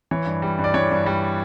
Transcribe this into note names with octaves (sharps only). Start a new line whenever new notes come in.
E3 C#5
G2
G3
G2
D5
E3 C#5
G2
G3